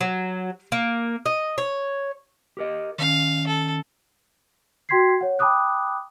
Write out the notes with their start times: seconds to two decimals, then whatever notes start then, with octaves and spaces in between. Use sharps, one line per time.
0.01 F#3
0.72 A#3
1.26 D#5
1.58 C#5
2.57 G4 A#4 D#5
2.98 D#3 C#4 F5
3.46 A4
4.89 F#4 G5 C6 G#6 B6 C7
5.21 C#5 F#5
5.39 G5 A5 B5 D6 D#6 F#6